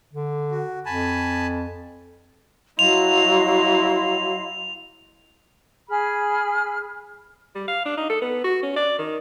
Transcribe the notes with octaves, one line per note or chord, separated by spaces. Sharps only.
D3
F#4
F2 G#5 A5 B5
F#3 E4 D#5 F5 C6 F7
G#4 B5 F6
G3
F5
D4
D#4
A4
B3
F#4
C#4
D5
D#3